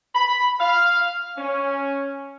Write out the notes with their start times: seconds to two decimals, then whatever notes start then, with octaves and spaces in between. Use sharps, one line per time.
0.15 B5
0.60 F5
1.38 C#4